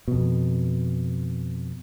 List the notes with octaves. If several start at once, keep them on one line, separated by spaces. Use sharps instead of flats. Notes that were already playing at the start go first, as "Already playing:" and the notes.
F2 B2